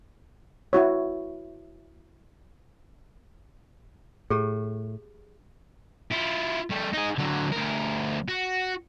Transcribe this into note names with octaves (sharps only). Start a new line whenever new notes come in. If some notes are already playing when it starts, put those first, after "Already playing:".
E4 F#4 C#5
A2 G4 G#4
E4 F4
G3 A3
D#4 G#4
D3 F#3
D2 A#4
F#4